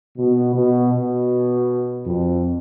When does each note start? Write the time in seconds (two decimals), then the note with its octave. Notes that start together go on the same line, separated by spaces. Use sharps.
0.18 B2
0.55 B2
0.93 B2
2.06 F2